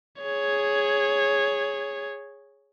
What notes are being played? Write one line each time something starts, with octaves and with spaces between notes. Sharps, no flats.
G#4 C#5